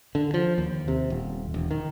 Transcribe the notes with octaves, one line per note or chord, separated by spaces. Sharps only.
D3
F3
D#2
C3
D#1
E1
D#3